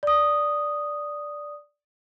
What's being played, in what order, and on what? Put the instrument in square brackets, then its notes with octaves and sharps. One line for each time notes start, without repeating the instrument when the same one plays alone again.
[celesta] D5 D#6